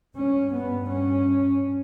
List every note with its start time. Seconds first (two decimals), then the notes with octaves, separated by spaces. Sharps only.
0.15 G2 C#4
0.54 B3
0.91 C#4